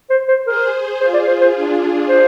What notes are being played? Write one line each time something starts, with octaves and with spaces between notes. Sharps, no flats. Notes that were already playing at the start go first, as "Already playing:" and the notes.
C5
C5
G#4 A#4 C5
F4 G#4 C5
D5
C5
C5
D4 F4
C5